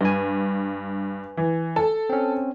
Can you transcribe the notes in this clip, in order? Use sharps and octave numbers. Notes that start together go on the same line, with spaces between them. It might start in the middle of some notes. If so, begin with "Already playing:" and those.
G2 B4 G#5
E3
A4
C4 C#4